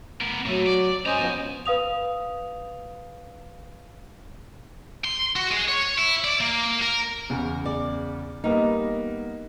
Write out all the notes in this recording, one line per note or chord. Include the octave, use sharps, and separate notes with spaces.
B3 A#4
A2 F#3 A3
D5
C#4 C5 D#5 G#5 A#5
F3 B3 C#4
B4 F5 D#6 F7
C6
F#4
G#3
C#5
E4
D5
A#3
A#4
E2 C#3
D5
G3 A#3 B3 D#4